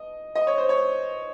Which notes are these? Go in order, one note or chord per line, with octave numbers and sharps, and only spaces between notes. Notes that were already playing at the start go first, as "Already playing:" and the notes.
Already playing: D#5
D#5
C#5
C5
C#5